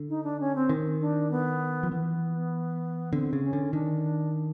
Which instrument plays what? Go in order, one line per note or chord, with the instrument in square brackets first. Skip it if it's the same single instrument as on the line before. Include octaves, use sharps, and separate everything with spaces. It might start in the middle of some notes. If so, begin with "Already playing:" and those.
Already playing: [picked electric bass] D3
[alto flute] D#4
D4
C#4
C4
[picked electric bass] D#3
[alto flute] D4
B3
[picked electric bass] F3
[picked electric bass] E3 [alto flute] B3
[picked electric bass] D3 [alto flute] C4
[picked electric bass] C#3
[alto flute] C#4
[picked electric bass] D3
[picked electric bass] D#3 [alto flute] D4